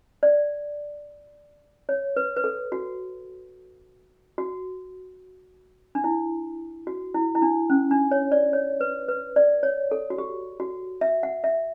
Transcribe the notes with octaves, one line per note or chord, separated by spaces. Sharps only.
D5
C#5
B4
B4
A4
F#4
F#4
D4
E4
F#4
E4
E4
D4
C#4
D4
C#5
D5
C#5
B4
B4
D5
C#5
A4
F#4
G4
F#4
E5
F#5
E5